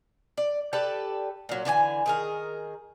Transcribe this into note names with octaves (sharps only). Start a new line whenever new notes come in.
D5
G4 A4 B4 D5
A#2 F#3
D3 E3 C#5 G#5
D#3 G#4 A#4